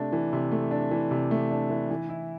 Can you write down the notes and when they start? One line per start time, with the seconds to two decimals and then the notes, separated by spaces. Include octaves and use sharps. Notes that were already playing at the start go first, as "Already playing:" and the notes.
Already playing: C3 A3 D4
0.12 E3
0.33 C3
0.51 A3
0.71 D4
0.91 E3
1.11 C3
1.31 A3
1.51 D4
1.70 E3
1.90 E3
2.09 E4